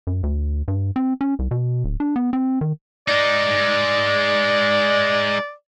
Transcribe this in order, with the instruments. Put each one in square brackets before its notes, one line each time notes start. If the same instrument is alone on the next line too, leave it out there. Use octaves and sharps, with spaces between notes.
[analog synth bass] F#2
D2
G2
C4
C#4
C2
B2
D1
D4
B3
C4
D#3
[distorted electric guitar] G#3 D#4 [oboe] D5